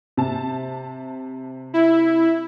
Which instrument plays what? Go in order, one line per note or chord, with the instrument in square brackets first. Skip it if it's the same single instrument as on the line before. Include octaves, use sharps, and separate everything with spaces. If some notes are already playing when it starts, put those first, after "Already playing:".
[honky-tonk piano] C3 A5
[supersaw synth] E4